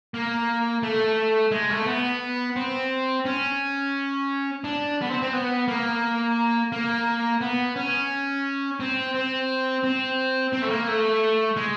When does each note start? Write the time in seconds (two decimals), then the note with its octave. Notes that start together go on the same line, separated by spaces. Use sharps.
0.14 A#3
0.83 A3
1.51 G#3
1.70 A3
1.86 B3
2.56 C4
3.25 C#4
4.64 D4
5.02 B3
5.10 C4
5.22 C4
5.33 B3
5.68 A#3
6.72 A#3
7.41 B3
7.76 C#4
8.80 C4
9.15 C4
9.84 C4
10.53 C4
10.62 A3
10.70 A#3
10.87 A3
11.57 G#3